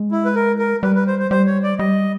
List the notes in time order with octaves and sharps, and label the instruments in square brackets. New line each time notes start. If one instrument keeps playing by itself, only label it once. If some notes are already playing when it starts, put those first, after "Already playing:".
Already playing: [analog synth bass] G#3
[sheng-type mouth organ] E4
B4
A#4
A#4
[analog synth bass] G3 [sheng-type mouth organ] B4
[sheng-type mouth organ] B4
C5
C5
[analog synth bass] G3 [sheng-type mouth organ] C5
[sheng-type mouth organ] C#5
D5
[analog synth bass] G3 [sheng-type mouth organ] D#5